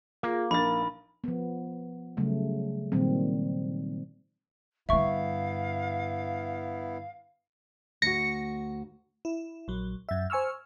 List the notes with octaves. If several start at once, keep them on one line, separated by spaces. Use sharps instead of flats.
A#3 F4 G#4
A#1 D#4 A#4 B5 A6
F3 B3
C#3 F#3 G3 A3
A#2 D#3 F#3 G3 C4
G2 D3 B3 E4 E5 F5 C#6
D2 F#4 A#6 C#7
E4
A#1 F#3
F#2 E5
C5 G#5 C#6 E6 F6